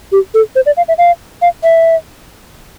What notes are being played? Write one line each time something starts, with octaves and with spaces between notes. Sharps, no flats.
G4
A4
C5
D5
F5
E5
F5
F5
E5